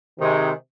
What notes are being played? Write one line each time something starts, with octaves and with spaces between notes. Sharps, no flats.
C3 D#3 G#3